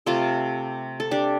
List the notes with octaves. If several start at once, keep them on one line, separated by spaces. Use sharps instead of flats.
C3 A3 F4 A4
A4
D4 G4